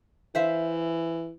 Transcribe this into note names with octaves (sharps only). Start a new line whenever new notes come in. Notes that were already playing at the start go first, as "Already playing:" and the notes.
E3 C5 E5 F5